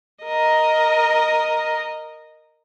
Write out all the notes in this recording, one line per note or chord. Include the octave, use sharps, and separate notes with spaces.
A#4 D#5